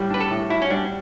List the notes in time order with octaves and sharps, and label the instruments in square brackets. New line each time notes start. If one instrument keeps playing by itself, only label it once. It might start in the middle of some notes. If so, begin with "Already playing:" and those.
Already playing: [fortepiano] A2 G3 F#4
[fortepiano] D4 [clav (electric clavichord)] B4
[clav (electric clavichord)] A4
[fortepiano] A2
[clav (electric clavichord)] E4 [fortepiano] F#4
[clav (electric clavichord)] C#4
[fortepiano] G3 [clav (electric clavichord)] D4